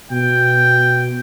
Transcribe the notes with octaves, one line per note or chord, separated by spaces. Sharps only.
B2 G5